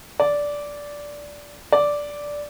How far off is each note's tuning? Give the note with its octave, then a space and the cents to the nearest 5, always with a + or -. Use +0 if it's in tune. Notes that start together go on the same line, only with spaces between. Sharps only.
D5 -10
D5 -5